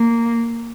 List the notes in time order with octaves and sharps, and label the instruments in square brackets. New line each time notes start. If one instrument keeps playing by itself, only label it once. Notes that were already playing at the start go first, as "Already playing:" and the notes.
Already playing: [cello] A#3